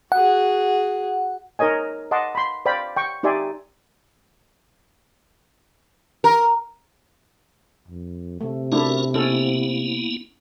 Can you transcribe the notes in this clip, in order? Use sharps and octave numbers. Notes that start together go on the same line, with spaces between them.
F#4 G#4 F#5
D#4 A#4 C#5 D#5 G#5
D#5 F#5 A5 C6 D6
B5 C6
C5 D5 F5 G5 B5 D6
G5 C#6
D#4 G4 D5 E5 G#5 C6
A#4
F2
C3 A3
A3 C#4 D4 E4 F#4 A#4
A#3 B3 C#4 E4 A4